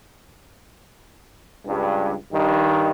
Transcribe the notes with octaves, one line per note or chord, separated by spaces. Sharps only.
C#2 G2
G2 D#3